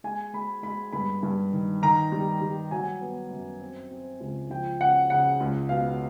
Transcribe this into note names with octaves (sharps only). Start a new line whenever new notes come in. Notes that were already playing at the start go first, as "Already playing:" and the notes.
G#3 G#5
G#3 B5
G#3 B5
G2 B5
G2
D#3
D#3 A#5
G3
G3
F#3 G#5
B3
F#2
C4
C4
C#2
F3 G5
C#3 F#5
C#3 F#5
C#2
B2 F5